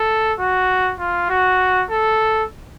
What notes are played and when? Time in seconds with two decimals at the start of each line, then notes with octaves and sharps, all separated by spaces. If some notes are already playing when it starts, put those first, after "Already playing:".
Already playing: A4
0.39 F#4
1.00 F4
1.30 F#4
1.90 A4